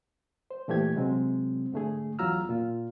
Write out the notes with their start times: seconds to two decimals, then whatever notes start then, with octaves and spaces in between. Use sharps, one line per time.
0.51 C5
0.68 A#2 E3 A3 G4 G#6
0.95 C3 F#3 G#3 C4
1.72 G#2 D3 A3 G#4
2.19 E2 F#3 F4 A#5 E6 F6
2.49 A#2 F4